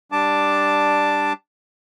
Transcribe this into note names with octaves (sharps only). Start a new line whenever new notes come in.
G3 D4 A5 D6